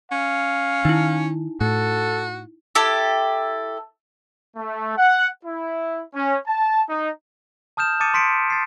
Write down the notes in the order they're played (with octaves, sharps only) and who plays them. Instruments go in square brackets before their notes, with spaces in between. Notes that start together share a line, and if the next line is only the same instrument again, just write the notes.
[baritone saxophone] C#4 [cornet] F5
[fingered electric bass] D#3 [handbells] D#4 E4
[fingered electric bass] A2 [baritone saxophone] F#4 [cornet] A4
[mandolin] E4 G4 A4
[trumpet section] A3
F#5
E4
C#4
A5
D#4
[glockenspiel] A5 D#6 F6 G6 E7
A5 D6 D#6 A6 C#7 D#7
C6 B6 C#7 D7
A6 C7